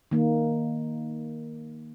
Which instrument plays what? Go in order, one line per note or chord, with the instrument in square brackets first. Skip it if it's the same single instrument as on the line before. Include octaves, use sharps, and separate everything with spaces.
[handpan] D#3 A#3